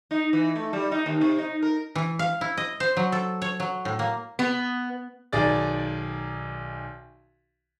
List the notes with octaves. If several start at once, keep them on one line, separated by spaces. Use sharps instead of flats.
D#4
E3
A3
G3
D#4
D#2
C3
D#4
A#4
E3
F5
E4
D#5
C5
F#3
A4
C#5
F#3
A2
A#3
B3
B1 D#3 G#4 D5 A6